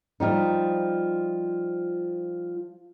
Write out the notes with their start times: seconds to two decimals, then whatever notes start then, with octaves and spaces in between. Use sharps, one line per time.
0.20 F3 G3 D#4